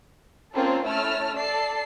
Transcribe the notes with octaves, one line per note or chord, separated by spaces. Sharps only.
A#3 C4 C#4 F4 A4 A#4
A3 C#4 E4 A5 E6 F6
A4 D5 A5 C7